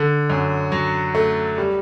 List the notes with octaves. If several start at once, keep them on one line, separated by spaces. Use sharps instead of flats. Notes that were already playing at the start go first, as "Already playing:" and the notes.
Already playing: D3
F#2
F#3
A3
G3